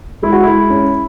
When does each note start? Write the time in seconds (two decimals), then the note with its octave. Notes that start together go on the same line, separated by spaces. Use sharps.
0.22 G#3 E4
0.32 F#4
0.44 G#3 E4
0.70 C#4